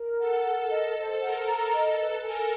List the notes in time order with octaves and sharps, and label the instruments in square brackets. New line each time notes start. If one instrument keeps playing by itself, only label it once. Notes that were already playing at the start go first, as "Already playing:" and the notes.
Already playing: [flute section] A#4
[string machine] A4 [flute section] F#5
[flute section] A#4
[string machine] A4 [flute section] D#5
[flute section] C5
[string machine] A#4 [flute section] F#5
[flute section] A#5
[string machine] A4 [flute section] D#5
[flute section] B4
[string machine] A#4 [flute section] G#5